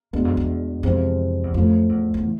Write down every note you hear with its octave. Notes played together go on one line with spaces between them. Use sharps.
E2 B2 G#3 B3 D4
F2
E2
F2 C3 E3 G#3 C4
E2
F2 A2 F3 A3 C#4 F4
E2
E2
E3